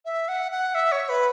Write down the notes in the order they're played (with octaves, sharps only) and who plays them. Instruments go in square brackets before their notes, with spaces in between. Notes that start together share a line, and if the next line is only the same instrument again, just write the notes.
[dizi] E5
F#5
F#5
E5
C#5
B4